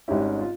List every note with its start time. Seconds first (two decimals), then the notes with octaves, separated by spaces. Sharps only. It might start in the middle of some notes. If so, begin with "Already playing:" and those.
0.08 G#1 G#2 G3 C#4 E4 G4
0.39 F4